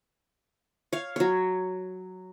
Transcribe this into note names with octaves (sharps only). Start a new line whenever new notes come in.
C#5 F5
F#3 C#5